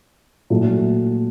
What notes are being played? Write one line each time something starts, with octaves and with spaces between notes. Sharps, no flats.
A#2 F#3 A3